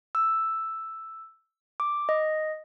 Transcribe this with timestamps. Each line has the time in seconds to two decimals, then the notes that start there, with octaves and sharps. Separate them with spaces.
0.15 E6
1.80 D6
2.09 D#5